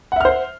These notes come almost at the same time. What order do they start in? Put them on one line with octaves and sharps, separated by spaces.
F#5 E5 F6 C5